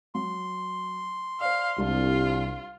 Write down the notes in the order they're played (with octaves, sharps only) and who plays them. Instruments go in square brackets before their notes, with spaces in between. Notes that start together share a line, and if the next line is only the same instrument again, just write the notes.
[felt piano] F#3 [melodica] C6
[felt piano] C5 D5 [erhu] F5
[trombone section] C2 [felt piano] G3 D4 [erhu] F4